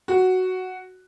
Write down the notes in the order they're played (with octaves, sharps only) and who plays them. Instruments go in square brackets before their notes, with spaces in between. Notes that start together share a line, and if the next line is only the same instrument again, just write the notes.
[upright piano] F#4